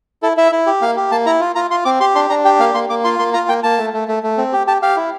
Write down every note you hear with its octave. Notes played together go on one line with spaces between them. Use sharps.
E4 A4
E4 E5
E4
G4
A#3 F5
G4
A#3 A5
E4 A#5
F4
F4 A#5
F4 C6
C4 D6
G4 C6
D4 C6
D4 A#5
G4 G5
A#3 F5
A#3 C6
A#3 D6
F4 C6
A#3 C6
F4 A#5
A#3 G5
A#3 A5
A3
A3
A3
A3
C4
G4
G4 A5
G4 F5
E4